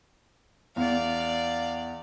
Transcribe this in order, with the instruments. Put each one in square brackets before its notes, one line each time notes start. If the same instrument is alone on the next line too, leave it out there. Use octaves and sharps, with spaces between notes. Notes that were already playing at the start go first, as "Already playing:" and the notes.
[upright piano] E2 [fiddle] D5 F5